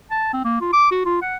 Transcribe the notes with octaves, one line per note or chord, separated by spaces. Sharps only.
A5
C4
A#3
F4
D6
F#4
F4
F#5